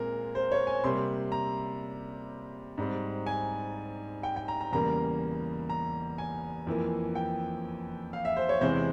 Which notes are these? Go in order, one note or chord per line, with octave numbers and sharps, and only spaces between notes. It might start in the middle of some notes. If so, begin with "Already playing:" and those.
Already playing: A#2 G#3 C4 A#4
C5
C#5
G#5
C3 G3 A#3 C6
A#5
G#2 G3 C4
G#5
G5
G5
A#5
A#5
E2 C#3 G3 A#3 A#5
A#5
G#5
F2 E3 A#3
G5
F5
E5
C5
C#5
E2 C3 E3 G#3 C4 C5